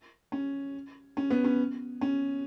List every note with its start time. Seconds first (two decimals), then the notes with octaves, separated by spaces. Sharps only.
0.32 C#4
1.17 C#4
1.30 B3
1.44 C#4
2.01 C#4